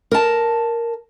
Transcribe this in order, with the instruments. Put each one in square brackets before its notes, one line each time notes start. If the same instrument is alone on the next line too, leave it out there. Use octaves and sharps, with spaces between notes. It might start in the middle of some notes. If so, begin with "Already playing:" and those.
[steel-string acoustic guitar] A#4 A5